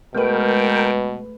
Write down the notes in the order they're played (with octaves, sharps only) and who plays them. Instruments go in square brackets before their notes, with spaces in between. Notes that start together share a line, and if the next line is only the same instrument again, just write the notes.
[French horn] B2 [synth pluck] G#3 A3 B4 [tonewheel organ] A#4 G5